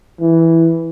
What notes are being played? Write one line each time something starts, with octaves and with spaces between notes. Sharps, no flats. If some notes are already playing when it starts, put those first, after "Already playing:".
E3